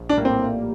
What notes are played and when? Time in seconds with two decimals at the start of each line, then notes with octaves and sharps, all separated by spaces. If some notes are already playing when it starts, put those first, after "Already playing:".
Already playing: A#1
0.09 D4
0.17 A2 G3 A#3
0.25 C4
0.41 A#1